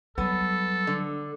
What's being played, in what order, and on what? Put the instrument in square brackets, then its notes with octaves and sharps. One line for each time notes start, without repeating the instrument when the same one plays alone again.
[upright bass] F#3 G3 [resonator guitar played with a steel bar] B3 [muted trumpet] A4
[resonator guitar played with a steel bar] D3